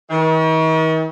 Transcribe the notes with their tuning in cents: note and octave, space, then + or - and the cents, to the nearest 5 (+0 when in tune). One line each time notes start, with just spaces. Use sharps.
D#3 +45